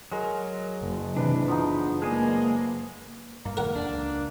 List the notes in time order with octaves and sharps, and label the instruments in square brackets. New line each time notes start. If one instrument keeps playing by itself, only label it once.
[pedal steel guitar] F#3 A#4 [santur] G#3
[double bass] F#1
[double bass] C3 E3 [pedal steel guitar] D4 [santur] B4
[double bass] F#1 [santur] F3 B3 D#4
[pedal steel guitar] G#3 G#5 [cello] A#3 [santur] G#4 D5
[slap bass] G2 [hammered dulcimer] A#3
[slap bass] A#2 D#3 G#3 [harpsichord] A#4 F#5
[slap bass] E2 [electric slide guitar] D4
[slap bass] C#2